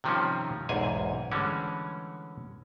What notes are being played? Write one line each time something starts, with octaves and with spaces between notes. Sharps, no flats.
C3 D#3 F3 G3 C4 C#4
B1 E2 G#2 G#4 G#5
D3 E3 G3 G#3 C#4